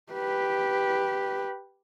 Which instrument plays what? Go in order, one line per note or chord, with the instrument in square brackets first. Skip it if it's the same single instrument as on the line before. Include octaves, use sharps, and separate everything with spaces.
[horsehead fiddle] G4 B4